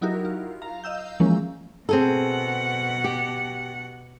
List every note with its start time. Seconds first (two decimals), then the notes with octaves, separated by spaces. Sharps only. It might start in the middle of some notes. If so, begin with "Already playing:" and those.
0.01 F#3 D#4 E4 F#4 G4 A#4
0.25 F4
0.62 F5 A#5
0.84 D#5 F5 E6 G6
1.20 E3 F3 G#3 A#3 C#4
1.89 B2 C4 G#4 A4 F#5
3.04 G4